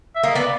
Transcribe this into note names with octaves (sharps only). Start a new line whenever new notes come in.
E5
A#3 D#5
B3 D5